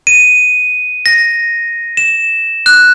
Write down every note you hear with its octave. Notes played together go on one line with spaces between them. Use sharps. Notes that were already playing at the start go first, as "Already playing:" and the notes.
D#7
A#6
E7
F#6